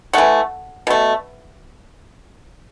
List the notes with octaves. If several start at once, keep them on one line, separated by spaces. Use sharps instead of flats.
E3 A3 F#5
B2 A3